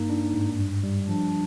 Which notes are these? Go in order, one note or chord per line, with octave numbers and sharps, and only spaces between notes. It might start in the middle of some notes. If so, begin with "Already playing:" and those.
Already playing: G2 A#3 D#4
D4
G#2
G2
G3
F3 D4